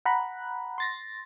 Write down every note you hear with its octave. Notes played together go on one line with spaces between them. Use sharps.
F#5 A#5 B5 F#6
C6 A6 A#6